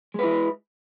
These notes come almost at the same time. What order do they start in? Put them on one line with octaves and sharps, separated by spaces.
G#3 B4 E4